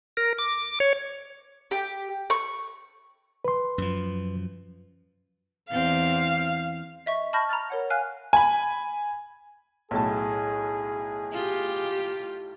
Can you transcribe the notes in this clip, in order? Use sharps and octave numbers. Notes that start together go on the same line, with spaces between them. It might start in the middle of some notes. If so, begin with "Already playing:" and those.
A#4
D6
C#5
G4
C#6
B4 C6
F#2 F3
E2 C4 F5
D#5 E5 C#6
A5 B5 C#6 F6 G6 A#6
A#5 B5 F6 A6
A#4 C#5 F#5
F5 G#5 F6 F#6
G#5 B5
B1 A2 G#4 A5
F4 G4